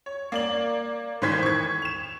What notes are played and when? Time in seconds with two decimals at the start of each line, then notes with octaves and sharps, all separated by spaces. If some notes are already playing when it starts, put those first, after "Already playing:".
0.06 C#5
0.32 A#3 D5 F#7
1.22 A2 D#3 E3 C5 G#6 B6
1.43 C#6 G#6
1.82 E7 F7